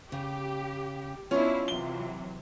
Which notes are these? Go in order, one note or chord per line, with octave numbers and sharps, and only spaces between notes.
C#3 G4
B3 C#4 D4 E4 F4 C#5 D#5
C3 E3 F#3 G7